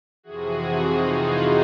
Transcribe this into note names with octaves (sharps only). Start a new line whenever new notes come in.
F2 C3 E3 F#4 G#4
D#4 F4
E4 F#4